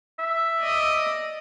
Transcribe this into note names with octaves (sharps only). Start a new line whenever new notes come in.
E5
D5 D#5